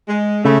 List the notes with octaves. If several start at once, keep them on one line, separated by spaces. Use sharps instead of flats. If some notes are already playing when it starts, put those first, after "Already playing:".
G#3
C#3 A3